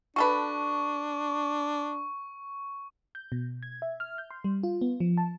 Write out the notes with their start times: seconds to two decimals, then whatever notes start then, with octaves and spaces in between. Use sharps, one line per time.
0.16 D4 F#4 A4 B4 C#6
3.15 G6
3.32 B2
3.63 G#6
3.82 E5
4.00 F6
4.18 G6
4.31 C6
4.44 G3
4.63 F4
4.81 B3
5.00 F3
5.18 A5